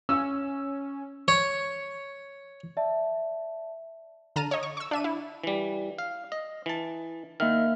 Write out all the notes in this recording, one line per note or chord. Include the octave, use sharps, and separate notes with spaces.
C#4 E6
C#5
D5 E5 A5
D3 A5 A#5 F6 D#7
C#5 D#5
C#6
C#6 E6
D4 E5 D#7
E4
E3 G3
F5
D#5
E3 A5
D#3 A#3 E5 F6